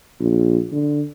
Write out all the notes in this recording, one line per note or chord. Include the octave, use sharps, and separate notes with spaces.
A#1
D3